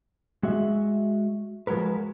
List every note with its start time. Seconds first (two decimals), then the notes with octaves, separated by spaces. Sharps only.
0.43 G#3 F#4 E5
1.67 F3 G#3 F#4 A#4 B4